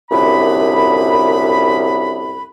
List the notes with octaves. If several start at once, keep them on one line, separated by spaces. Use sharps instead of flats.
C2 F#2 A#2 D3 B5